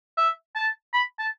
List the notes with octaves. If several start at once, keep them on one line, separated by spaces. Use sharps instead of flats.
E5
A5
B5
A5